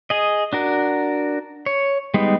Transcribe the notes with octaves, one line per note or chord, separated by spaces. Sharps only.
G#4 D#5
D4 F#4 A#4
C#5
G3 G#3 B3 D#4